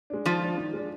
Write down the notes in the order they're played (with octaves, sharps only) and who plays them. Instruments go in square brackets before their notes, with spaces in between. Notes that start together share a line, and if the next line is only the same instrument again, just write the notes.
[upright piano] G#3 D4
[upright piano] D#3 [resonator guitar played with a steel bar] F3 F4
[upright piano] G#3 D4
D#3
G#3
D4